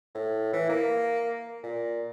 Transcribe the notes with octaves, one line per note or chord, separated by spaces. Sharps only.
A2
E3
A#3
A#2